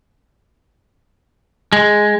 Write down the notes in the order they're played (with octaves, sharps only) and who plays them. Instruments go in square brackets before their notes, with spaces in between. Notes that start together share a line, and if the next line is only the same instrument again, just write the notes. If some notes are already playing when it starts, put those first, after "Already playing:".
[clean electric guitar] G#3